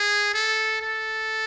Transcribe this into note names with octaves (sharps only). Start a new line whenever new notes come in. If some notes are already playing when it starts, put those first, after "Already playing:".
Already playing: G#4
A4
A4